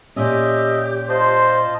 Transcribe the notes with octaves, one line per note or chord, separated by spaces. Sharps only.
A#2 C#4 G4 D#5 E5
F4 C5 D#5 A5